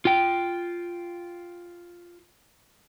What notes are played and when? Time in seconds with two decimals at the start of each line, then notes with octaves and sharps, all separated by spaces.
0.05 F4 G5